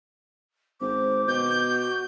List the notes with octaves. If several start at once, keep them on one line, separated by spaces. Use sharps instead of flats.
G#1 C5 D6
B2 F#4 G6